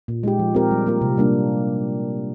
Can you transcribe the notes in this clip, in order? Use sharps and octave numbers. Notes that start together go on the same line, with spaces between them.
A#2
G#3 D#4 G4
F3
C4 G4 A#4
G3
A#3 F4 A#4
C3
G3 A#3 D4